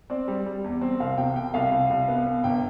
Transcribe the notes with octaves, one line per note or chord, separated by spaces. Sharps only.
C4 D5
G3
G3
E2
C4
C2 F5
C3 G5
C3 G5
C2 F5
C2
C2
B3
B3
G1 G5